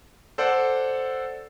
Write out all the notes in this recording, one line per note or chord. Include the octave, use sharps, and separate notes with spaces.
A4 C5 D5 F#5